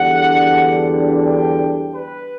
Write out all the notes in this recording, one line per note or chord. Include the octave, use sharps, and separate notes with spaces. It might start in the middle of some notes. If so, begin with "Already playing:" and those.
Already playing: E2 D3 G3 D4 F#5
G5
B4